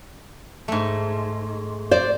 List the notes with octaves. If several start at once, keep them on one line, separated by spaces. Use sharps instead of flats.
G#2 A3
C5 D5